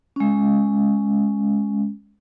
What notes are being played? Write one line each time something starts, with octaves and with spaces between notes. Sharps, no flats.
G#3 C#4